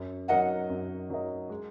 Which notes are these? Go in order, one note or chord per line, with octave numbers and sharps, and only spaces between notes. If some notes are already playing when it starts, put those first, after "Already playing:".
Already playing: F#2
F#3 D#4 A#4 D#5 F#5
F#2
F#3 D#4 A#4 D#5
G#3